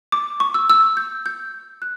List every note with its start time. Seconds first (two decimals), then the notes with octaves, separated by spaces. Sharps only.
0.12 D6
0.40 C#6
0.54 E6
0.70 E6
0.97 G6
1.26 G6
1.82 F#6